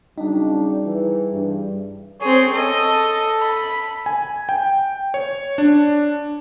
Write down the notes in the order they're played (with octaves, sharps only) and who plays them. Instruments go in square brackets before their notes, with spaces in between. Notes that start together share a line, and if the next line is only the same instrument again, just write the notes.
[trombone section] C#3 F#3 D4 [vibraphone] G3 G#4 [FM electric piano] D#4
[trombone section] E3
G2
[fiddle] C4 G#4 [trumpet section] C#5
[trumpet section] A4 [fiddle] D#5
[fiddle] B5
[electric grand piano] G#5
G5
C#5
D4